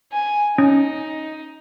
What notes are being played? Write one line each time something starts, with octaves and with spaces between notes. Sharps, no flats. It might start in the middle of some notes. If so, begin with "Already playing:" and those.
G#5
C#4 D#4